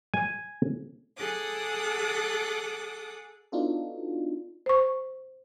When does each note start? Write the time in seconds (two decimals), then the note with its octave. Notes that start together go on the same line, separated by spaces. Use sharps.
0.14 G#5
1.17 G#4 A4 F#5 D6 D#6
3.52 B3 D4 D#4 F4 F#4 A4
4.66 C5 C#6